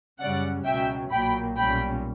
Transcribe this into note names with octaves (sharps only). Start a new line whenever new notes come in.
F#2 C#3 G3 C#4 D5 F#5
C#2 B2 F#3 C#4 E5 G5
B1 A#2 F#3 A#3 G5 B5
B1 A#2 G3 C#4 G5 B5